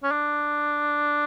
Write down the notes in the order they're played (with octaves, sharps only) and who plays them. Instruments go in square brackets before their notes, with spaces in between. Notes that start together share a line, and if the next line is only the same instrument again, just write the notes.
[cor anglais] C#4
D4